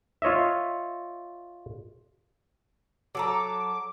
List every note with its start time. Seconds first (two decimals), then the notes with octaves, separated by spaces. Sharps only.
0.22 F4 C#5 D#5 E5
3.15 F#3 A4 A#5 D6